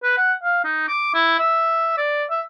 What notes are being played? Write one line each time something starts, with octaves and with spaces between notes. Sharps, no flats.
B4
F#5
F5
D#4
D6
E4
E5
D5
E5